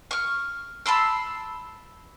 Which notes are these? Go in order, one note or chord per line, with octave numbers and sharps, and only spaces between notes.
C#6 F6
A5 B5 C6 E6